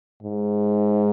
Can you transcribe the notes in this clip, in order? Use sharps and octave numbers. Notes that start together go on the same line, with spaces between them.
G#2